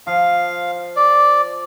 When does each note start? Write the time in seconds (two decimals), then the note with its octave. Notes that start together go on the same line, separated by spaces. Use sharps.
0.07 F3 F5
0.96 D5